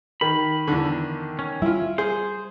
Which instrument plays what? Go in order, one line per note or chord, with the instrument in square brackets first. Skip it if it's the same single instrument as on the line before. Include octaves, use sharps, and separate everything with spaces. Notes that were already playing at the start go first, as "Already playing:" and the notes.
[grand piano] D#3 [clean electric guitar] B5
[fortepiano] E2 D3
[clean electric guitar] C#4
[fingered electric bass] G3 [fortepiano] E4 F4
[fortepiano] G#4 [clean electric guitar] C5